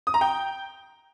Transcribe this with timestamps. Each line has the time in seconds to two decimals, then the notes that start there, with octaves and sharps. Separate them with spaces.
0.07 D#6
0.14 A#5
0.21 G5